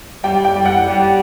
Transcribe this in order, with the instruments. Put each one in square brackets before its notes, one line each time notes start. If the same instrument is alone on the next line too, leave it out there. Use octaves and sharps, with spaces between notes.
[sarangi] G3 [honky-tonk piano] G5
[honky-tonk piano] G5
[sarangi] G3
[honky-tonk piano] F#5
[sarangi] G3